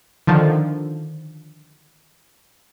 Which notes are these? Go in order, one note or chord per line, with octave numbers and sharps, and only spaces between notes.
D3 D#3 F3